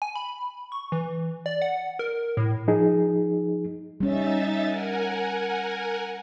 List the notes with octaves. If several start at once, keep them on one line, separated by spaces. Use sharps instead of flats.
G#5
B5
C#6
E3
D5
F#5
A#4
A2
F3 D#4 G#4
G3 C#4 D#4 E5 A6
A#4 F#5 G#5